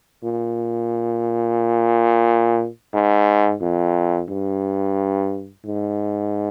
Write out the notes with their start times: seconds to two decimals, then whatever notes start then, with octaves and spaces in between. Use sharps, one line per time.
0.24 A#2
2.94 G#2
3.62 F2
4.29 G2
5.65 G#2